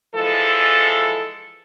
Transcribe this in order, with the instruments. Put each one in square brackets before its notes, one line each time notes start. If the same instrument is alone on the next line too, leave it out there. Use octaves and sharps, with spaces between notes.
[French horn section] E3 F3 G#3 A4